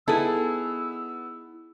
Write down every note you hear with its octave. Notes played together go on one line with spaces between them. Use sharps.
B3 D#4 E4 G#4 A4 E6